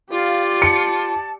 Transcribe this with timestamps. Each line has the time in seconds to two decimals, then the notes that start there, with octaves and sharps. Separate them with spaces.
0.10 F4 G4 D5 F5
0.62 A5 C#7